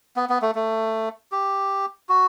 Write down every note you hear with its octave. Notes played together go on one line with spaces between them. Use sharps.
B3
B3
A3
A3
G4
F#4